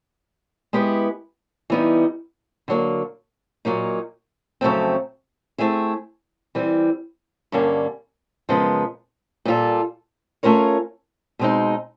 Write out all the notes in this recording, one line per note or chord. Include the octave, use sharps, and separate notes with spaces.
G#3 B3 E4 G4 B4
E3 G3 B3 D#4
D3 F#3 A#3
A#2 F#3 A#3 D#4
F2 C#3 F#3 A3 C4
A3 C4 E4 G#4
E3 G3 C4
G2 D3 G3 A#3 C#4
F#2 C#3 F3 G#3 B3
A#2 G3 C4 F4 A4
A3 C#4 F4 A#4 C#5
B2 G#3 C4 D#4